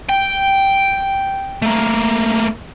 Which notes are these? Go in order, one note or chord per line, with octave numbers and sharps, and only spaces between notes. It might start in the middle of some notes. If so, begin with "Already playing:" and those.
G5
A3 A#3